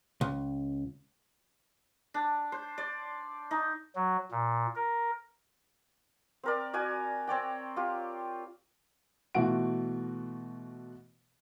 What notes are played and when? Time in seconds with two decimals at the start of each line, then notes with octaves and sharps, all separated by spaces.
0.21 C#2
2.14 D4
2.52 C5
2.78 D5
3.51 D#4
3.96 F#3
4.31 A#2
4.75 A#4
6.43 C4 A#4 D5
6.73 F#4 D5 G#5
7.27 C4 C#5 D5 G5
7.76 F4 G4
9.35 B2 E3 A3 F4 F#4 D7